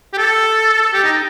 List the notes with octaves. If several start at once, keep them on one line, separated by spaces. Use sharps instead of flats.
G4
A4
A4
G4
D#4